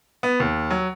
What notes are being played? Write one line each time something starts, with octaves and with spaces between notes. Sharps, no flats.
B3
D#2
F#3